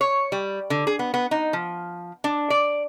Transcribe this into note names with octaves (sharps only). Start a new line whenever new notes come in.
C#5
G3
D3
G#4
B3
B3
D#4
F3
D4
D5